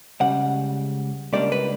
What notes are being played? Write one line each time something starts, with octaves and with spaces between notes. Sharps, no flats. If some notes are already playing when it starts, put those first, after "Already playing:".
C#2 C#3 G3 F#5
C#2 C#3 G3 A#3 D4 D5
B4